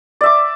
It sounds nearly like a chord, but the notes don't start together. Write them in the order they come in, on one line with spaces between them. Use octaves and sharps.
D5 E5 D6